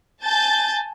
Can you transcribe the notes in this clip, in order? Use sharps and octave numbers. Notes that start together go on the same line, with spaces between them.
G#5 A5 G6 A6